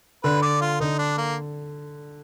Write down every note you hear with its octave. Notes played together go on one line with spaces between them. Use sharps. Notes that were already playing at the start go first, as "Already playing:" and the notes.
D3 B4
D5
F4
D3 D#4
D4
A#3